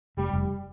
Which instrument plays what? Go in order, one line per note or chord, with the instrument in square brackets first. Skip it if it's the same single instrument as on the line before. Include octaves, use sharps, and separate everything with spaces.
[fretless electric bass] F1 [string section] G3
[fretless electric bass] F1